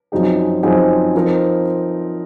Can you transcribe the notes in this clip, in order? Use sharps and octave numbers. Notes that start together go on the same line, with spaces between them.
F#2 F3 C4 D#4 G#4
F#2 F3 C4 D#4 G#4
F3 C4 D#4 A#4